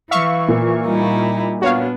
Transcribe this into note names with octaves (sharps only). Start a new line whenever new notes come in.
E3 E5 F5 C#6
A#2
G3 D#4 E4
B3 D4 F#4 C#5 F5